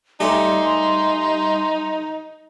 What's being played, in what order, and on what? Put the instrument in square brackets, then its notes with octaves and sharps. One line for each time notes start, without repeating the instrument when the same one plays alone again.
[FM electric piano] G3 G#5 A#6 [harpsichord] A3 G4 D5 [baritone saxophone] D#4 [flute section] C6